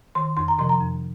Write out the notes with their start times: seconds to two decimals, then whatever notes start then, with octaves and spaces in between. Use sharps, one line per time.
0.15 D#3 C6
0.37 F2 C6
0.48 A#5
0.58 C3 F3 C6
0.69 A#5
0.81 F2